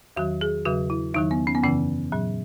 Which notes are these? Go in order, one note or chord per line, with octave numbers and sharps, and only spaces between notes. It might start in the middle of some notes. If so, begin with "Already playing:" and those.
E2 D#3 F#3 F#4
G#4
E2 C#3 F#3 F#4
E4
E2 D#3 F#3 D#4
B3
C#4
B3
F#2 C#3 E3 C#4
A#2 F#3